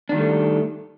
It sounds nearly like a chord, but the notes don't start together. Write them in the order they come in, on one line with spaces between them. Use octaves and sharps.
D4 D#3 G3 A3